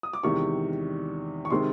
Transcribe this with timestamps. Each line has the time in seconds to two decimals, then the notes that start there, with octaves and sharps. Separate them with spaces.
0.03 D#6
0.13 D6
0.23 E2 C3 D#3 G#3 C#6
1.45 C#6
1.50 C3 D#3 G#3 C4 C6